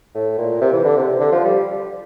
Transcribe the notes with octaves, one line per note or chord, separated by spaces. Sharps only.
A2
A#2
C3
E3
D3
C3
D3
F3
G3